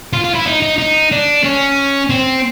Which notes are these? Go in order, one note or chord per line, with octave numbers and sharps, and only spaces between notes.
F4
F4
E4
D#4
D#4
D#4
D4
C#4
C4